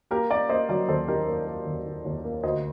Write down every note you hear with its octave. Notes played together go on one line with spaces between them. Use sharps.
A#3 G4 A#4
A#3 A#4 D5
A#3 C5 D#5
F#3 A#4 D5
D#2 A4 C5
D#3 G4 A#4
A#3
A#3
D#2
D#3
D#2
A#3
D2 C5 D#5